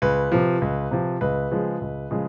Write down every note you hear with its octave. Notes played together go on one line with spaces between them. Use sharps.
C#2 B4
C3 F3
C#2
C3 F3
C#2 B4
C#3 F3 G#3
C#2
C#3 F3 G#3